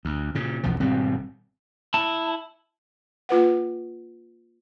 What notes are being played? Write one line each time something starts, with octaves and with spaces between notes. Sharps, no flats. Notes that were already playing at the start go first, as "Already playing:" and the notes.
D2
A#2 C#3
B1 E2 F3
G#1 B2 G3 C4
E4 A5
A#3 F4 B4 F#5